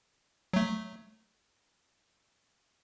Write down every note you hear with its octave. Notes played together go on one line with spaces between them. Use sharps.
F#3 A3